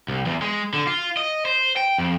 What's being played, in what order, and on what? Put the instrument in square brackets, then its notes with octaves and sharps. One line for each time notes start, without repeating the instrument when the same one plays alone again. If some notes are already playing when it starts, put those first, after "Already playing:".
[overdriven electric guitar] C2
E2
G#3
D3
F4
D#5
C5
G5
F2